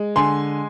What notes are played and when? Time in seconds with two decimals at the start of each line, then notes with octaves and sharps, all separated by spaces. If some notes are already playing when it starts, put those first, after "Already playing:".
Already playing: G#3
0.16 D3 G#5 C6